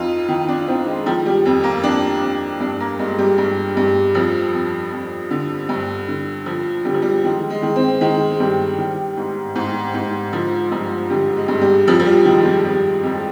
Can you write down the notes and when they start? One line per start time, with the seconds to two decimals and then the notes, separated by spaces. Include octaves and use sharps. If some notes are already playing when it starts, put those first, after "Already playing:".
Already playing: F2 D#4 F4
0.28 D#3
0.48 D4
0.68 D#3 C4
0.86 G#3
1.06 D#3 F3
1.26 G3
1.45 F2
1.64 A#3
1.83 F2 D4
2.22 F2
2.60 G2 D4
2.80 A#3
2.99 G2 G#3
3.18 G3
3.38 G2
3.77 G2
4.14 F2 F3
4.53 F2
4.92 F2
5.31 D3
5.69 G2
6.08 D3
6.46 D3 F3
6.85 D3 G3
6.94 F3
7.02 G3
7.24 D#3 G#3
7.50 G#3
7.62 D#3
7.76 C4
8.01 D#3 G#3
8.31 G#3
8.40 G2 G3
8.78 D#3
9.17 G#2
9.56 G#2
9.94 G#2
10.33 D3 F3
10.71 G2 F3
11.10 D3 G3
11.36 G#3
11.48 G2
11.61 G3
11.87 F2 F3
12.00 F3
12.06 G3
12.25 D#3 G#3
12.45 G3
12.64 F2 G3
13.03 F2 G#3